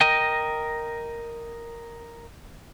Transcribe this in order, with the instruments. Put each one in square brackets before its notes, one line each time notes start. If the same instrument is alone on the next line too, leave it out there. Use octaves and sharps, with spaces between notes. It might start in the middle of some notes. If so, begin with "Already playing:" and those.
[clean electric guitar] A#4 D#5 G5